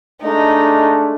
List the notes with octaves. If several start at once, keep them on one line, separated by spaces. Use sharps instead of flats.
G#3 A3 D4 D#4